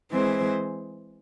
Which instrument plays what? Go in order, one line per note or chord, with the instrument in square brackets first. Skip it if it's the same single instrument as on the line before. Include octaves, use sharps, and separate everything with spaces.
[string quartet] E3 G#3 C4 G#4 C5